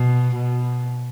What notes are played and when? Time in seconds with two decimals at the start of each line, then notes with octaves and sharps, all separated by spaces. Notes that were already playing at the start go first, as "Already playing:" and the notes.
Already playing: B2
0.36 B2